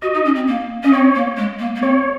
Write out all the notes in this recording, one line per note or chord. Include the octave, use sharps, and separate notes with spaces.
F#4 D#5
D#4
C#4
C4
A#3
C#4 D#5
C4 C#5
A#3
G#3
A#3
A#3
C4 C#5